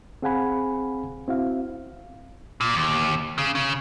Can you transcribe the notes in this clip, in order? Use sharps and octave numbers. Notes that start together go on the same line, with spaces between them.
C4 G#4 F5 F#5 G#5 B5
C4 E4 F#4 F5
A#2
D#2
C#3
C#3